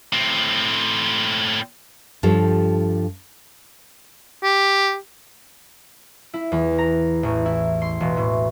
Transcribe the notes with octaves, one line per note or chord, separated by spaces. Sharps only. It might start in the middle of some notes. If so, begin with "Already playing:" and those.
A2 C4
G2 F3 G4 A4 C#5
G4
E4
E2
A#5
A1
E4
C6
E1
A2